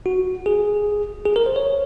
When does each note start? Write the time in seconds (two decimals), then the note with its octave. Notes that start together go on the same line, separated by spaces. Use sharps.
0.06 F#4
0.46 G#4
1.25 G#4
1.36 A#4
1.46 C5
1.56 C#5